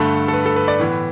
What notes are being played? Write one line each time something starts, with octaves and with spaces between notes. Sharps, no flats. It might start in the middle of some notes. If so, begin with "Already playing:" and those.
Already playing: G2 D3 A3 A4
A4
B4
A4
B4
D5
A2 E3 B3